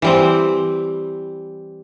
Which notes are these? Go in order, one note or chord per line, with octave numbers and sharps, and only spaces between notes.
E3 G3 C4